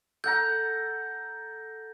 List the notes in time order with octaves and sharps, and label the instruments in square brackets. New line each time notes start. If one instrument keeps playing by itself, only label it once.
[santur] A4 F#5 A#5 [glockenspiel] G6